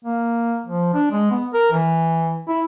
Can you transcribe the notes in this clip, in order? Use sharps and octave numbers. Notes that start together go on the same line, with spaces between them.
A#3
F3
D4
G#3
B3
A#4
E3
E4